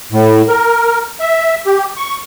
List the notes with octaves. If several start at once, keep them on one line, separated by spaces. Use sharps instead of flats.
A2
A#4
E5
G4
C#6